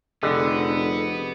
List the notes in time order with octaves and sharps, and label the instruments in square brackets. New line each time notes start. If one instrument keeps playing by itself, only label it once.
[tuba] F1 [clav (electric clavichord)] D3 [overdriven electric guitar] B3 [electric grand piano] G4 G#4 D#5